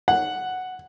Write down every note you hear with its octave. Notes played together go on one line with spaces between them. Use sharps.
F#5